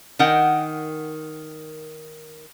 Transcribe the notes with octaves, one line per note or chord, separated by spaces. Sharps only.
D#3 A#4 F#5 G5